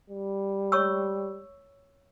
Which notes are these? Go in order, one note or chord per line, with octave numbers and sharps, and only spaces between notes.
G3
C#5 C#6 E6